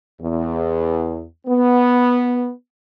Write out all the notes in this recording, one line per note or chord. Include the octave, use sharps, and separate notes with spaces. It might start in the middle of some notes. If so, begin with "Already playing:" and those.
E2
B3